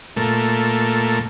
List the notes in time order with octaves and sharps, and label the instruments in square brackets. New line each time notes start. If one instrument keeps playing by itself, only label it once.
[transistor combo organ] A#2 A3